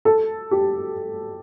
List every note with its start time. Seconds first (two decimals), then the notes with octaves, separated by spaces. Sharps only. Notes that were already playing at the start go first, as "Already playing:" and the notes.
0.05 A4
0.51 G4